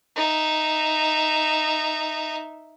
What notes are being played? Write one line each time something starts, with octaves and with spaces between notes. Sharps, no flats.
D#4 E5